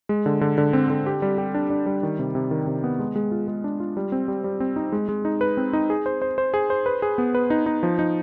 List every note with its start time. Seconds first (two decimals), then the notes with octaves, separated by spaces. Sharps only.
0.09 G#3
0.26 D3
0.41 D3
0.58 D3
0.73 C4
0.90 D3
1.06 G4
1.22 G3
1.38 G4
1.54 D4
1.70 D4
1.86 G3
2.03 D#3
2.19 C3
2.35 C3
2.51 D#3
2.67 C3
2.84 B3
2.99 G#3
3.16 G#3
3.31 F4
3.48 G#3
3.64 D4
3.80 F4
3.97 G3
4.12 C4
4.28 G3
4.44 G3
4.60 C4
4.76 D#4
4.92 G#3
5.09 G#3
5.25 D#4
5.41 B4
5.57 C4
5.73 D#4
5.90 G#4
6.06 C5
6.22 C5
6.38 C5
6.54 G#4
6.70 C5
6.86 B4
7.02 G#4
7.18 B3
7.35 B4
7.50 D#4
7.66 D#4
7.83 F3
7.99 D#4